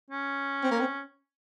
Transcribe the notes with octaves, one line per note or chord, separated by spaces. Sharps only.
C#4
C4
A#3
C4